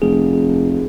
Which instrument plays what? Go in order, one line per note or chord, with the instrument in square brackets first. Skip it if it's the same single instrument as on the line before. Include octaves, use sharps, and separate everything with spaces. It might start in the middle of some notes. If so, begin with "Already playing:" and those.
[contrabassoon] F1 [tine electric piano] G#4